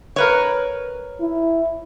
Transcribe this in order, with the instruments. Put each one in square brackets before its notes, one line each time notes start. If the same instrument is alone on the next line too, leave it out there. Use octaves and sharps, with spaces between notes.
[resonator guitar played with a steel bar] A#4 B4 C#5
[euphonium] E4